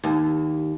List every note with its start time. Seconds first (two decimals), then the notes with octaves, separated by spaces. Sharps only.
0.04 D#2